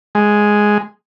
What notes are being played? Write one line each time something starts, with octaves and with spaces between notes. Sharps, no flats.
G#3